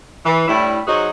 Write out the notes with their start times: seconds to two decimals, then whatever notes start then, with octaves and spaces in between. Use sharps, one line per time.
0.26 E3
0.48 A2 G3 D4 E4
0.87 F#3 D#4 F#4 G#4 C5